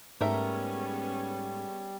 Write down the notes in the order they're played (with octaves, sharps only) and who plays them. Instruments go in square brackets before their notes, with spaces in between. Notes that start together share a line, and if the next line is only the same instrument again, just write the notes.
[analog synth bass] G#2 [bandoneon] G3 [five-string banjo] A3 A#4 E5 [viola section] B3 C#4 G#4